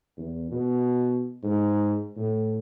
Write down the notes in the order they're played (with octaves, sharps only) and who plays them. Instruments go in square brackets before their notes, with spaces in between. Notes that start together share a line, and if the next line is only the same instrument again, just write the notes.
[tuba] E2
B2
G#2
A2